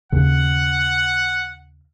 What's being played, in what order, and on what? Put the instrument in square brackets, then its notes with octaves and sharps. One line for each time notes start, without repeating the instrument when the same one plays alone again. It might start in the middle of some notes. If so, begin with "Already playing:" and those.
[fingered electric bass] D#2 C#3 [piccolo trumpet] F#5